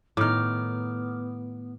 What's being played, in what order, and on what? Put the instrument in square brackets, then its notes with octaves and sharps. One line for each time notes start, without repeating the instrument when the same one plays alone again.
[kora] A2 D#3 [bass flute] B3 [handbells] D6 F6